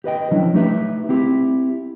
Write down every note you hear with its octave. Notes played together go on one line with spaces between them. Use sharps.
G4 B4 D#5 G5
F3 F#3 C#4 D4 E4
A3 D#4 G4 B4 E5
C4 E4 G4